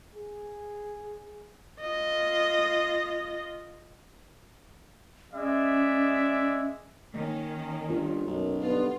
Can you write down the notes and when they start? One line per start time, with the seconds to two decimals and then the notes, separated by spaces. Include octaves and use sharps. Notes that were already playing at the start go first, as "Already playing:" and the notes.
0.15 G#4
1.81 F4 D#5
5.34 G#3 C#4 D5 E5
7.14 D#3 A#3 C#4
7.89 G1 F4 A#4
8.26 B1 F#2
8.62 G2 D3 B3 F4